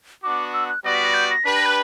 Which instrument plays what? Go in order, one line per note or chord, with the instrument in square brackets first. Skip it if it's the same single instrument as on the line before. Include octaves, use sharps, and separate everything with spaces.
[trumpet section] B3 D4 F#4 [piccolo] D6
[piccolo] E6
F#6
[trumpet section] G3 B3 F#4 B4 D5 [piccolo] A#6
[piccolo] B6
A#6
G6
A#6
[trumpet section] D4 G4 B4 [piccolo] B6
[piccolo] A#6
F#6